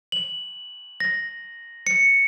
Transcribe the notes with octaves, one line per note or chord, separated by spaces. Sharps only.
F#7
A#6
C#7